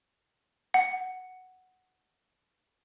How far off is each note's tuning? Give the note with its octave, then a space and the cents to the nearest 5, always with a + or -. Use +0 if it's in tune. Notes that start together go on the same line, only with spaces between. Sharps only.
F#5 +0